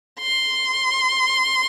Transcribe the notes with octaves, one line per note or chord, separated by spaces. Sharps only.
C6